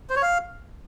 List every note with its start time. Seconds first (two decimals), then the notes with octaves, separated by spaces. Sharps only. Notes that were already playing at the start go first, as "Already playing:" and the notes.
0.10 C5
0.16 C#5
0.22 F5